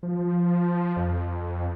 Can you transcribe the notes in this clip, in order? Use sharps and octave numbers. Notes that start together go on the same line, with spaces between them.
F3
F2